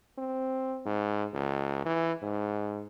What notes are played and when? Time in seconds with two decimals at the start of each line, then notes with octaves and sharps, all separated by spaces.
0.18 C4
0.86 G#2
1.34 C#2
1.85 E3
2.22 G#2